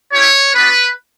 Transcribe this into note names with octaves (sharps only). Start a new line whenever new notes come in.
C#4 E4 G4 C#5
B3 D4 F#4 B4